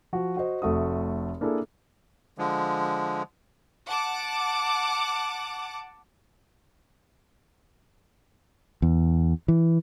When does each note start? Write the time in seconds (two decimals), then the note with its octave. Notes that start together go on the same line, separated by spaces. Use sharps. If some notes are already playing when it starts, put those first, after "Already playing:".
0.13 F3 F#4
0.37 F#4 C5 D#5
0.62 F1 A3 F#4 D#6
1.41 A#3 D4 E4 G#4 A4
2.38 D3 F3 G#3
3.87 F#5 A5 D6
8.82 E2
9.48 E3